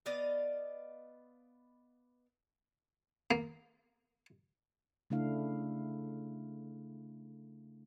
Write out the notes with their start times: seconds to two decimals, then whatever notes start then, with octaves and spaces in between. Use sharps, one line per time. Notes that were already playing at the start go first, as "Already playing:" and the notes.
0.06 B3 D5 D#5 F5
3.31 A#3
5.10 C#3 A3 D4 E4 F5